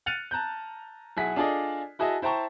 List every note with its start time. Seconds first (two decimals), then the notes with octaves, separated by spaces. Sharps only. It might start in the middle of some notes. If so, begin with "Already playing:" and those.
0.06 F6 F#6 A6 C#7 D#7 F7
0.31 A5 A#5 F#6 G6
1.17 B1 E4 G#4 F#5 B6
1.36 D4 F4 G#4 A4 D5 D#5
1.99 E4 F#4 G#4 D#5 E5 A5
2.22 E4 C5 G5 A5 A#5 C#6